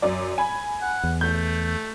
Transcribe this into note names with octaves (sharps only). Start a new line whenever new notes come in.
F#2 D5
G#5 B5
F#5
E2
A3 G6